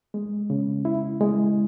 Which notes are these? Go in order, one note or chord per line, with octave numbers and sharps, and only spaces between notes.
G#3
C#3
E4
G#3